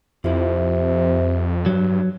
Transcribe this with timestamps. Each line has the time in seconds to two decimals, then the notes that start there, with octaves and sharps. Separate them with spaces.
0.24 F2 C3 F3 E4
1.66 G2 F#3